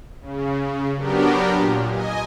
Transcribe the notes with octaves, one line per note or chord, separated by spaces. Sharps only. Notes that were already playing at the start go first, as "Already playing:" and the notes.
C#3
F#3 B3 D4 G4 A#4
A#2
D#5 G#5